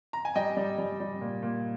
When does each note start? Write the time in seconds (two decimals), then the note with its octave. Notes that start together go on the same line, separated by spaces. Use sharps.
0.13 A#5
0.25 G#5
0.35 G3 D#5 G5
0.57 G3
0.78 G3
1.00 G3
1.21 A#2
1.43 A#2